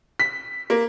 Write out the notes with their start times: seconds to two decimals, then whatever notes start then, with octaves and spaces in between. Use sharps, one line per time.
0.20 B6
0.70 A#3